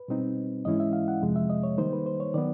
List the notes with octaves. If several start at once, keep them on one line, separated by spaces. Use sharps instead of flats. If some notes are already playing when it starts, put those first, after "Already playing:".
Already playing: B4
B2 G3 C4 D#4
G#2 E3 G#3 C#4 E4 D#5
E5
F5
F#5
F2 C3 F3 G#3
E5
D#5
C#5
D#3 G3 A#3 D#4 C5
B4
C5
C#5
D#3 F#3 B3 D5